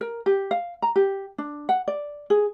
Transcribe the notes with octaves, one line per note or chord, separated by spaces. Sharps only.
A#4
G4
F5
A#5
G4
D4
F#5
D5
G#4